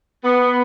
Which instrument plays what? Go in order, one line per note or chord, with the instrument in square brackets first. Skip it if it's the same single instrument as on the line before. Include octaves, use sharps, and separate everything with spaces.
[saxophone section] B3